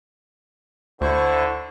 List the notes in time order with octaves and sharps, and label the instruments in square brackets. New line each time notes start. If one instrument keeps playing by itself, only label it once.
[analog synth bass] D2 [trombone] D3 [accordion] E4 C5 C#6